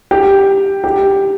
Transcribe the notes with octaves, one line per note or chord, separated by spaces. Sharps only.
G4
G4